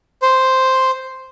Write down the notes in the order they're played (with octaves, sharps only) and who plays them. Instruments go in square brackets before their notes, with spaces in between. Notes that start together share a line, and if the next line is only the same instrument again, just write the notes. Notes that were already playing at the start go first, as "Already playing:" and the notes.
[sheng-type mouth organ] C5